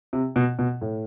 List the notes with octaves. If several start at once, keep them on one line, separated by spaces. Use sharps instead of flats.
C3
B2
B2
A2